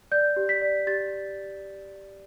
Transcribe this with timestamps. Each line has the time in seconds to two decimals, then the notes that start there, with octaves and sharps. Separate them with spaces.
0.11 D5 G6
0.37 G4
0.49 B6
0.62 D5
0.87 G4 A6